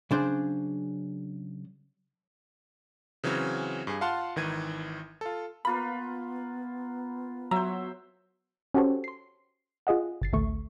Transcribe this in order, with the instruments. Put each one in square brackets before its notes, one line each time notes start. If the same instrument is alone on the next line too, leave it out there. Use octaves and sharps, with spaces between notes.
[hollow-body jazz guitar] C#3 F#3 D4 G#4 C5
[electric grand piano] C#3 E3 F#3 C4 C#4
G2 G#4
F4 F5 F#5 A5 C6
G#1 D#3 E3 G#6 D#7
F4 A4
[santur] A#3 F4 B4 [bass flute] B3 [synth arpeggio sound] B5
[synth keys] F#3 [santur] C5 E5 [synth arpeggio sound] A#5
[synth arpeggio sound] C#4 F#4 G4 A4 C5 C#5
C6 C7
F4 G#4 D#5 F#5
G1 A6 C7
A1 D2 A3 C#6